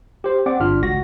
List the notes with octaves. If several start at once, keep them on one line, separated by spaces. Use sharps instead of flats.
G4 C5
C4 D5 F#5 D6
G1 D4 F4 F6
G#1 C#2 F#4 A#6